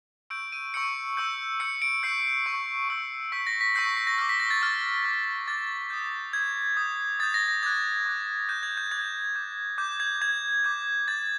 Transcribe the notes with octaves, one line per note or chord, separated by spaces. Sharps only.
C#6 E6 G6 D7
D#7
C#6 E6 G6 C#7
C#6 E6 G6
C#6 E6 G6 C#7
D7
C#6 E6 G6 C7
C#6 E6 G6
C#6 E6 G6
C#6 E6 G6 B6
A#6
B6
C#6 E6 G6 C7
B6
A#6
D6 F6 A#6
B6
A#6
A6
D6 F6 A6
D6 F6
D6 F6 A6
D#6 G6
D#6 G6 G#6
D#6 G6
D#6 G6 A6
A#6
A#6
D6 F#6 G#6
D6 F#6
D6 F#6 G6
G#6
G6
D6 F#6 G#6
D6 G6
D6 G6
G#6
D6 G6 G#6
D6 G6
D6 G6 A6